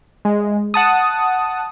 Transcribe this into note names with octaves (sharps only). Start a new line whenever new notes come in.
G#3
F#5 A5 D#6